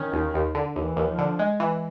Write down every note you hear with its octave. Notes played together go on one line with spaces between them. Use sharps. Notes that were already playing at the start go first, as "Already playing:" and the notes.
Already playing: D#3 C#4
D#2
D#2
D3
D#2 E3
D#2
F3
D3
G#3
E3